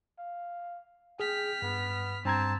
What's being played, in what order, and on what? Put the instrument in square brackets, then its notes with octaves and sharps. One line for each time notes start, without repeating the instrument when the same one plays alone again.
[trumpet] F5
[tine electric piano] G#4 [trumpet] G5 [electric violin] F6 B6
[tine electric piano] G2 [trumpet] B3
[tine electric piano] G2 A#5 G#6 [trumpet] C4 [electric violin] A5